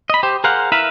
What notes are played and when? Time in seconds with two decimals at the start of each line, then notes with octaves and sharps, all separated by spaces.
0.10 D#5 B5
0.23 G4 C5
0.44 G#4 A#4 C5 F5 F#5
0.72 E4 A#4 B4 E5 F5